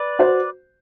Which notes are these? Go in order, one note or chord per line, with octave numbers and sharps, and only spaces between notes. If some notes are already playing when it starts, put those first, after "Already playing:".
Already playing: B4 D5
F#4 C5